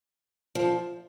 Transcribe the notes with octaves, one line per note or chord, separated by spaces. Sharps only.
F3